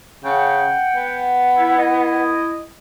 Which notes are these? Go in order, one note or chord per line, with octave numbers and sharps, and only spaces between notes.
C#3 F#5 G5
B3
E4
E4 D#5